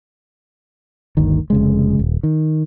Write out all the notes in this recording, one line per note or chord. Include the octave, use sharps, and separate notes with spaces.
G1 D2 D#3
F1 C#3 G#3
D#1
D#3